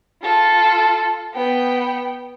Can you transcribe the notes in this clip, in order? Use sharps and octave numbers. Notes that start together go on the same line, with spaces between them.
F4 A4
B3 G5